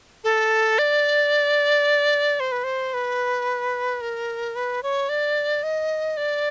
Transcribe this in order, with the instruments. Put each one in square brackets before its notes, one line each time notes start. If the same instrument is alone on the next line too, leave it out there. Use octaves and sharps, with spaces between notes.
[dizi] A4
D5
C5
B4
C5
B4
A#4
B4
C#5
D5
D#5
D5